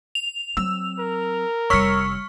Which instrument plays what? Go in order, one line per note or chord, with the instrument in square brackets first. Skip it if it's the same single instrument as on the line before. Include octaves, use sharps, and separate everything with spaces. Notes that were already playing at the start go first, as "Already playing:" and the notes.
[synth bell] F7
[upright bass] F#3 C4 [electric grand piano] E6
[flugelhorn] A#4
[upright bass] F1 G3 [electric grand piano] C#5 E6 B6 [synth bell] C#6 F6 C#7